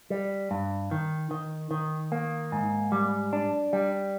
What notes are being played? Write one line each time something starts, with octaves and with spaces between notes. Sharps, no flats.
G3
G2
D#3
D#3
D#3
A#3
G#2
G3
D4
G3